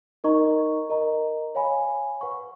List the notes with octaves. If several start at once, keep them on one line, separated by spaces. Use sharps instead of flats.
D#4 A#4 D#5 A#5 C#6
A#4 D#5 A#5
C#5 F5 G#5 B5
B4 F#5 C#6